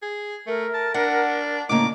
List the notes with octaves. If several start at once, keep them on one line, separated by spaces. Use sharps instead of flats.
G#4
A3 A#4
A5
D4 F#5
A2 C#3 A#3 D#5 D6